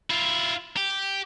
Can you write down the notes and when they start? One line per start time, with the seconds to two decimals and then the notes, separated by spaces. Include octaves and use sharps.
0.10 E4 F4
0.77 G4